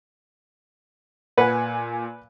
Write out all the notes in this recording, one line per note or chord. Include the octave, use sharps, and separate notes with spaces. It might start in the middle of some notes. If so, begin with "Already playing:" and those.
A#2 B4 F#5 G#5